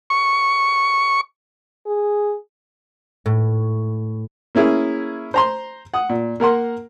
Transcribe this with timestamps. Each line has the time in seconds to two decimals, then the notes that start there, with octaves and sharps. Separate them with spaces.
0.10 C#6
1.86 G#4
3.26 A2
4.55 A#3 C#4 E4 G#4
5.34 C5 A#5 C6
5.94 F#5 D#6
6.09 A#2
6.40 A#3 A#4 F#5 C6